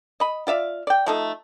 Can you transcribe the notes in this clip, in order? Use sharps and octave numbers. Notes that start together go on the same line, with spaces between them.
D#5 B5
F4 D5 E5 F5
D5 G5
F3 A3 D#4